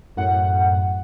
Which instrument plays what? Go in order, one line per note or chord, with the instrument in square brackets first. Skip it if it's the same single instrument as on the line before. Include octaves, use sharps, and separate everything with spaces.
[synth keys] F#2 A2 F#5